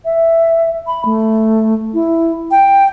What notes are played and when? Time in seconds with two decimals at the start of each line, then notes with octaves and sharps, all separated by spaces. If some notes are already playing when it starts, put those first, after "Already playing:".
0.05 E5
0.87 B5
1.05 A3
1.94 E4
2.51 G5